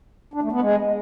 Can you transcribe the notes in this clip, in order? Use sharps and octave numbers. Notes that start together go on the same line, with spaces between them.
D4
A3
B3
G#3